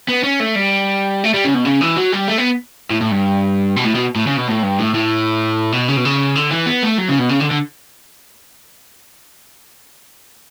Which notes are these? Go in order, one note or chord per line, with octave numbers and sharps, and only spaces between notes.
B3
C#4
A3
G3
A3
G3
C#3
B2
C#3
E3
F#3
G3
A3
B3
A2
A2
G2
B2
A2
B2
A2
C#3
B2
A2
G2
A2
A2
B2
C#3
B2
C#3
D3
E3
B3
A3
F#3
C#3
B2
C#3
D3
D3